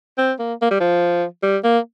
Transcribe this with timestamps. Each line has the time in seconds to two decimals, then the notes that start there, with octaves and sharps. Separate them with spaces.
0.18 C4
0.39 A#3
0.62 A#3
0.71 G3
0.80 F3
1.43 G3
1.64 A#3